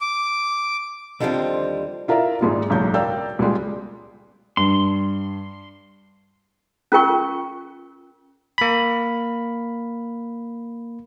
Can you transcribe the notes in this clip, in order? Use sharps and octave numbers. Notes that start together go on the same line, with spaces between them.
D6
D#2 D3 F3 G3 C4
E4 F4 A#4 D5 E5 F5
G#1 G#2 G#3 F4
F#1 B1 G#2 C#3 F#3 G6
A#4 D5 F5 G5 E6 G6
C#2 G3 G#3
G2 C6
C#4 F4 A#4 G5 C#6
A#3 B5